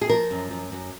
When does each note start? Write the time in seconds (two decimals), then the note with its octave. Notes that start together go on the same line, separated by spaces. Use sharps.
0.01 G#4
0.09 F3 A#4
0.31 F#2
0.51 F#2
0.72 F#2